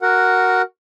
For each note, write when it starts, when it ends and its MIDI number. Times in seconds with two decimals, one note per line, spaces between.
0.02 0.62 66
0.02 0.62 70
0.02 0.62 78